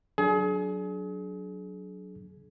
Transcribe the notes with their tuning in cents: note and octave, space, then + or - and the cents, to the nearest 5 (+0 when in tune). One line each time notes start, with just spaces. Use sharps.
F#3 +0 D4 -10 G#4 +35